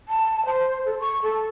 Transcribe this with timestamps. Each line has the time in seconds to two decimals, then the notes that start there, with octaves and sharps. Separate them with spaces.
0.08 A5
0.46 C5
0.86 A4
1.00 C#6
1.23 A4